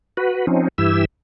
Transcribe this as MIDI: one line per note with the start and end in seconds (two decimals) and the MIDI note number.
0.17 0.46 66
0.17 0.46 71
0.47 0.68 53
0.47 0.68 60
0.47 0.68 61
0.47 0.68 63
0.78 1.05 43
0.78 1.05 52
0.78 1.05 64
0.78 1.05 67
0.78 1.05 88